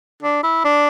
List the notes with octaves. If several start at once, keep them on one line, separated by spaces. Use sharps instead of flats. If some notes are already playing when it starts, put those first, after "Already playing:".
D4
E4
D4